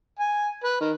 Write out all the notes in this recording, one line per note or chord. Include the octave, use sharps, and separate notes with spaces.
G#5
B4
D#3